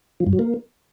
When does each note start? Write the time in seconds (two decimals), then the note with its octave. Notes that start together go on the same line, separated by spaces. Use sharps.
0.20 F3
0.27 G2
0.33 F#3
0.39 A#3